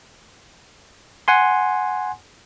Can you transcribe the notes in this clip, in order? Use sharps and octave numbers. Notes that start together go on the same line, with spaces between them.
F#5 G#5 C6